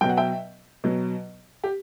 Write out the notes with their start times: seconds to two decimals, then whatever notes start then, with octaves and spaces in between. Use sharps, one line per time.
0.01 B2 F#3 G5
0.09 F#5
0.17 E5 G5
0.84 B2 F#3
1.64 G4